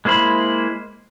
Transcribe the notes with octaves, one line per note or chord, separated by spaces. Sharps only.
G#3 A#3 E4 C5 B5